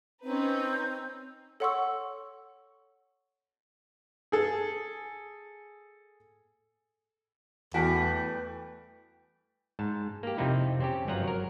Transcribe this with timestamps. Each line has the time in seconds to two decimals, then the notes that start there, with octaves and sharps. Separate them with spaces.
0.24 C4 C#4 D#4 B4
1.60 A4 C#5 F#5 C6 C#6 E6
4.32 G#4 A4
7.74 E2 E3 G3 A3 F#4 A5 B6 D7
9.79 G#2 A5
10.23 A#3 G4
10.38 F2 C3 F3 C4 D#4 E4
10.80 C4 C#4 G4
11.07 G1 F#2 F3 F#3 F#5 A#5
11.24 F#3 A#4